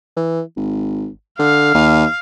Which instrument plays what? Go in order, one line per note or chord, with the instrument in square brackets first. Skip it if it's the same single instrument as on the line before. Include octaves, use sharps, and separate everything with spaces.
[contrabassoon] E3
G#1
[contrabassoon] D3 [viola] F5
[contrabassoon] D#2